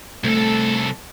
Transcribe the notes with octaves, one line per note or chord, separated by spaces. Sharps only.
C2 A3 A4